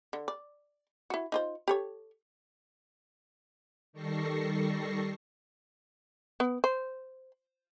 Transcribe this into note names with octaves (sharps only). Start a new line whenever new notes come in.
D3
D5
E4 F#4
D#4 F4 C5
G4 A4 C#5
D#3 G3 A4 C#6 A#6 C7
B3
C5